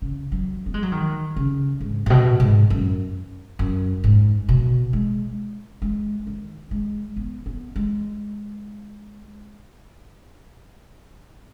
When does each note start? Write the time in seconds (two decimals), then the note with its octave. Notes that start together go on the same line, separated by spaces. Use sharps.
0.02 C#3
0.32 F#3
0.66 B3
0.74 G#3
0.83 F#3
0.92 D#3
1.36 C#3
1.80 G#2
2.06 G#2
2.10 B2
2.40 G#2
2.70 F#2
3.59 F#2
4.04 G#2
4.49 B2
4.93 G#3
5.82 G#3
6.27 D#3
6.71 G#3
7.16 B3
7.46 B3
7.76 G#3